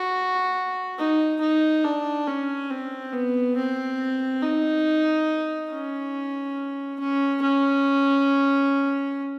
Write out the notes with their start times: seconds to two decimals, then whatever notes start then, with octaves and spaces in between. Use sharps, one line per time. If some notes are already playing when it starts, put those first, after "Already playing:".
Already playing: F#4
0.99 D#4
1.41 D#4
1.84 D4
2.28 C#4
2.71 C4
3.13 B3
3.56 C4
4.42 D#4
5.71 C#4
7.00 C#4
7.42 C#4